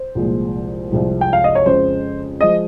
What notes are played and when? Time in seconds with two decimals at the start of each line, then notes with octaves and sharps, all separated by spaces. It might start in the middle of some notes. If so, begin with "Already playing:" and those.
Already playing: C5
0.15 C2 A#2 F3 G#3
0.91 C2 C3 F3 G#3
1.21 G5
1.33 F5
1.44 D#5
1.55 C#5
1.66 F2 C#3 G#3 C5
2.41 F3 G#3 D#5